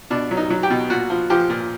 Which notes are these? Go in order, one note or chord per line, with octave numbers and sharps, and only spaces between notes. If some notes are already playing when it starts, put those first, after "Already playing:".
B2 D4
F#3
D#4
F#3
G4
B2
A#2 F#4
F3
F3 G4
A#2